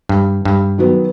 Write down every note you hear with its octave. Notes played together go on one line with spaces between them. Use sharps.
G2
G2
D#3 F#3 B3